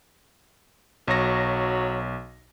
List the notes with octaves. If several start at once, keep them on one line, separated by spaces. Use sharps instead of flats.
B1 F#3 A#6